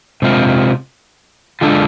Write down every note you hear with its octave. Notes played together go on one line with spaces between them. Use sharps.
C3 G#3 C4 F4
D3 G#3 D4 F4 A4